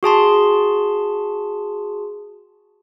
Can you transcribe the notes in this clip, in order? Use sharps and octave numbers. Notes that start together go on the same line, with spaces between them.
F#4 G#4 A5 C6